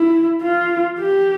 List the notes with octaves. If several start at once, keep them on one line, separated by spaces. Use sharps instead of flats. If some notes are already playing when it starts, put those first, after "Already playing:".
Already playing: E4
F4
G4